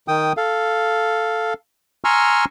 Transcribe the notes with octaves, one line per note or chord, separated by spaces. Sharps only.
D#3 G5 D#6
A4 F5
G#5 A#5 C6 C#6 E6 F6